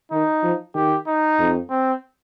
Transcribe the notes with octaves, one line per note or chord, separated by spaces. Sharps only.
D#3 D#4
F3
D#3 G4
D#4
F2
C4